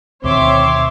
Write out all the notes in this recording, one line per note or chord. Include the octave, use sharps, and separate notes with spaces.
D2 B2 D#3 C4 C#5 E5 C6 D6